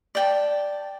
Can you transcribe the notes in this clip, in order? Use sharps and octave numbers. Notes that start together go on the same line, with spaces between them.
D5 G5 A5